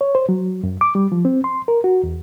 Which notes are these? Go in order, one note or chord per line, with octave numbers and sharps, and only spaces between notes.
C#5
C5
F#3
F#2
D6
G3
F3
C4
C6
A#4
F#4
E2